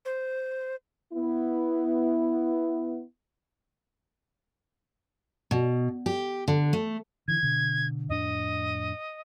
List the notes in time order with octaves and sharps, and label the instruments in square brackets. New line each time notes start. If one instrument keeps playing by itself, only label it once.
[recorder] C5
[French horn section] B3 E4
[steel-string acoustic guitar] B2
G4
D3
A3
[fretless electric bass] D3 E3 [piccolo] G#6
[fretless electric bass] B2 D3
[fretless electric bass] F2 A2 D4 [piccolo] D#5